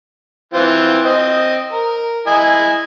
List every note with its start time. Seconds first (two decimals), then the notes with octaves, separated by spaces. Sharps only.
0.53 E3 C4 F4
1.05 C4 D#5
1.72 A#4
2.27 E4 D#5 G#5